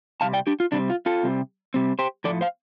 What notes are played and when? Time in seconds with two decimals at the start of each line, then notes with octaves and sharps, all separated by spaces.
0.21 C3 G3 C4 F5 A5
0.33 D5 G5
0.47 D4 G4
0.60 F4
0.72 C3 G3 C4 D4
0.90 F4
1.06 F4 A4
1.23 C3 G3 C4
1.74 C3 G3 C4
1.99 G4 C5
2.24 A2 F3 A3 A4 D5
2.41 C5 F5